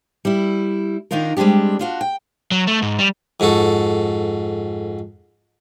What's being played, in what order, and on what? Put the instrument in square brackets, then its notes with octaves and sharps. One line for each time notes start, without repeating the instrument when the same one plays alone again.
[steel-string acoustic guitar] G3 E4
D#3 D4 D#4 F4 A#4
G3 G#3 C4 D4 G4
D4 F4 F#4
G5
[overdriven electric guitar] F#3
A3
G#2
G3
[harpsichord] F2 G#2 F#4 A4